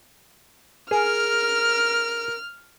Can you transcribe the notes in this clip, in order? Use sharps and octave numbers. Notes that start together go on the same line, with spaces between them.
G#4 A#4 F6